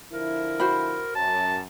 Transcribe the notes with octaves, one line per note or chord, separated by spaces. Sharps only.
D3 F3 E4 A#4
F#4 C5 B5
F#2 A5